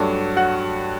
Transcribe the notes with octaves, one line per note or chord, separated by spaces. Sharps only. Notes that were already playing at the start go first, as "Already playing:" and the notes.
Already playing: G2 F#3 A3 D4 F#4
F#4 F#5